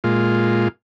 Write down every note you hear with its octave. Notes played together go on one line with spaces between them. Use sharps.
A#2 G#3 F4